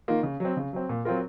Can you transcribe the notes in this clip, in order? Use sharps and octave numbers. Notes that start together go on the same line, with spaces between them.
D#3 A#3 F4
C#3
F#3 C4
C#3
F#3 C4
A#2
F#3 C4 F4 A#4